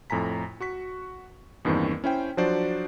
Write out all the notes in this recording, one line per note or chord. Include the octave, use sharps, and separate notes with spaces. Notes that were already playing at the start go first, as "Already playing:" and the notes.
F2 A2 G#5 A#5 B6
F#4 C#6 B6
E2 G2 D#3 E3 A#3 C4
C#4 E4 C5 G5
F3 F#3 D4 F#4 C5 D5